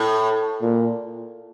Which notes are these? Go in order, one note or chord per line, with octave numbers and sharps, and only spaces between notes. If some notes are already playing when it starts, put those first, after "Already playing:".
Already playing: A2
A#2